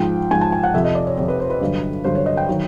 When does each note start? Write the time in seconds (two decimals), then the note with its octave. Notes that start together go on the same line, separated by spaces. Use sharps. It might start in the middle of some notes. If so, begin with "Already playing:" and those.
Already playing: G#2 F3 G5
0.31 G#2 G#5
0.34 F3
0.41 A5
0.52 G#5
0.63 F#5
0.74 F2 C3 F3 E5
0.84 D#5
0.95 D5
1.07 C#5
1.17 F2 C3 F3 C#5
1.28 B4
1.40 C5
1.50 B4
1.61 G2 D3 F#3
2.04 G2 D3 F#3 C5
2.15 C#5
2.26 D#5
2.37 G5
2.49 D#3 F#3